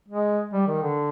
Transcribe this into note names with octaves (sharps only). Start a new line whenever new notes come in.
G#3
G3
D#3
D3